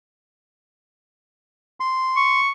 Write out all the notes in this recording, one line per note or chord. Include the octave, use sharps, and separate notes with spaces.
C6
C#6